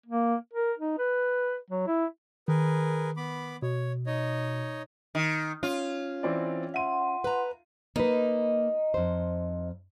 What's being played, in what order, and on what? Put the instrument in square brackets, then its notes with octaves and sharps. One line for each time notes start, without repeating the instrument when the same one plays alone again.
[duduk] A#3
A#4
D#4
B4
F#3
E4
[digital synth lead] D#3 [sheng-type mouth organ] G#4 A#4 B4
[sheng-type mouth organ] B3 B5 D6
[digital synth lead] B2 [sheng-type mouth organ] C#5
[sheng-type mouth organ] D#4 C#5 D#5
[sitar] D#3
[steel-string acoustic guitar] C#4 [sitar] F4
[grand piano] E3 C4 D5
[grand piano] E5 D#7 [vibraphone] F#5 C6
[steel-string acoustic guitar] B4 A#5
[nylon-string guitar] A#3 B4 [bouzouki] D#4
[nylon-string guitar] F2 C5